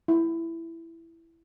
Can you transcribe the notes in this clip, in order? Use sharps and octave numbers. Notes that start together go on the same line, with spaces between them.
E4